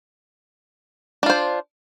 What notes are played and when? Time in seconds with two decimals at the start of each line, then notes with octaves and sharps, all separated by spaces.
1.23 D4
1.26 F4
1.30 C5